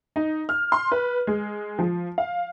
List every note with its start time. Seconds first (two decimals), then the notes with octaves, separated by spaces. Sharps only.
0.16 D#4
0.49 F6
0.72 C6
0.92 B4
1.27 G#3
1.79 F3
2.18 F5